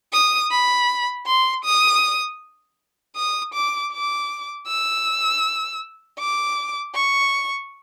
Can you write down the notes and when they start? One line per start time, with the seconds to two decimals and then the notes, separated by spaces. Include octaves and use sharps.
0.13 D#6
0.51 B5
1.27 C6
1.65 D#6
3.16 D#6
3.54 D6
3.92 D6
4.68 E6
6.19 D6
6.95 C#6